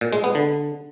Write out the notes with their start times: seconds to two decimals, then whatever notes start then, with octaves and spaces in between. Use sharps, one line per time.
0.01 A#2
0.13 G#3
0.24 B3
0.35 D3